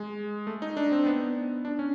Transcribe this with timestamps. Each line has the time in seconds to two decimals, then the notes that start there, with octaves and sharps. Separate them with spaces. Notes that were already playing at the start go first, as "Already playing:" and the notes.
Already playing: G#3
0.47 A3
0.62 D#4
0.77 D4
0.92 C4
1.06 B3
1.65 D4
1.79 C#4